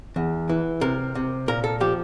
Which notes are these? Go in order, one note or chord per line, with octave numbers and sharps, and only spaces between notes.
E2
E3
C3 A#4
C3
A#2 A#4
A4
F3 G4